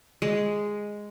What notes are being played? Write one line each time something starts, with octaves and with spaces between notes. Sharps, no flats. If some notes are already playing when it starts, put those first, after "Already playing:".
G#3